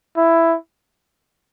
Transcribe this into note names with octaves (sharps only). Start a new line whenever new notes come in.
E4